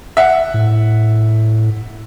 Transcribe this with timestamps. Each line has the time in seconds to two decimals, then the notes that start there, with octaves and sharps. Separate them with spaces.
0.17 E5 F#5
0.54 A2